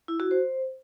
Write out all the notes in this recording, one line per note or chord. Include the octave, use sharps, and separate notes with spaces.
E4
F#4
C5